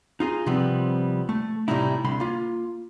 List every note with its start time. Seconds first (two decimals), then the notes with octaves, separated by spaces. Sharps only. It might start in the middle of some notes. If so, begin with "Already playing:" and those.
0.20 D#4 F4 G#4
0.46 C3 F3 G3 B3 C4
1.29 A3
1.68 A2 C3 G3 G#3 D#4 E4
2.04 C2 D3 B5 C6
2.20 A#3 F4